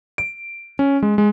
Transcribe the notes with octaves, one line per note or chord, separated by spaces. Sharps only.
D7
C#4
G#3
G#3